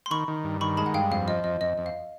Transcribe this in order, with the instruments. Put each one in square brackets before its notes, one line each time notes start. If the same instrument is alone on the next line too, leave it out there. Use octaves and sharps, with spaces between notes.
[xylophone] C6
[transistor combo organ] D#3 [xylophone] B5 C#6
[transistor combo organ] D#3
G2
[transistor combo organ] D#3 [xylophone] B5 C#6
[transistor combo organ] G#3 [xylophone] A5 B5
[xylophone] F#5
[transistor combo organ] G2 [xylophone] F5 G5
[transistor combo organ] F2 [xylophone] F5
[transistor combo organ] F3 [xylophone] D#5
[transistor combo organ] F2 [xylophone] D#5
[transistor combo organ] F2 [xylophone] D#5
[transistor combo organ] F2
[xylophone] F5